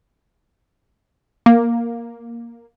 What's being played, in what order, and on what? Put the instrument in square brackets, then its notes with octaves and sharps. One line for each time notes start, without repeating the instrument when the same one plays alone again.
[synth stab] A#3